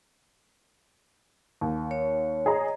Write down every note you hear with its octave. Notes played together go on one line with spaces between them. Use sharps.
D#2
C#5
G#4 D#5 A#5